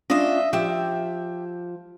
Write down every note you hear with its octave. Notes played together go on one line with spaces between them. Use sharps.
C#4 D4 F4 D#5 E5
F3 G4 E5 E6